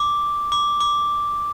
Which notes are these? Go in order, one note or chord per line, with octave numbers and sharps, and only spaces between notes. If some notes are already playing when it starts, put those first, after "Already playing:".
Already playing: D6
D6
D6